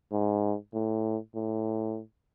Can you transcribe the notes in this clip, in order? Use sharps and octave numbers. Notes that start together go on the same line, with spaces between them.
G#2
A2
A2